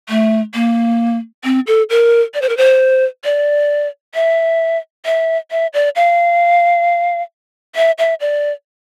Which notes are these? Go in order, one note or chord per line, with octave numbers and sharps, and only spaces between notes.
A3
A#3
C4
A4
A#4
D5
C5
A#4
C5
D5
E5
E5
E5
D5
F5
E5
E5
D5